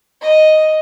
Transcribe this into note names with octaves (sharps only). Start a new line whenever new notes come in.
D#5